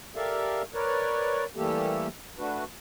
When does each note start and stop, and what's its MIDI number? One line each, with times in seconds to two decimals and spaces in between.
0.16 0.62 67
0.16 0.62 69
0.16 0.62 70
0.16 0.62 74
0.16 0.62 76
0.16 0.62 77
0.74 1.45 70
0.74 1.45 71
0.74 1.45 73
0.74 1.45 74
1.56 2.08 52
1.56 2.08 55
1.56 2.08 57
1.56 2.08 58
1.56 2.08 67
1.56 2.08 69
2.38 2.64 57
2.38 2.64 62
2.38 2.64 66
2.38 2.64 71